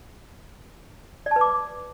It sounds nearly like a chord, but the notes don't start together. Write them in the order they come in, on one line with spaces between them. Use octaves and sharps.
D5 A5 B4 D6